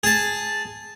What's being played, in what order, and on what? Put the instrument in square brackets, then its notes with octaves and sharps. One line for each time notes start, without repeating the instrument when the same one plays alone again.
[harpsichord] G#4 A5